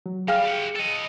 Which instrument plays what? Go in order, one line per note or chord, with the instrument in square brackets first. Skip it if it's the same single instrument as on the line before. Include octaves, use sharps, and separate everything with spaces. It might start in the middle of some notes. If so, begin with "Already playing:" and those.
[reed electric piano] F#3
[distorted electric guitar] G3 [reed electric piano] G#4 [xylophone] F5 G5 F6
[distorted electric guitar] G4 F#5
A4 D#5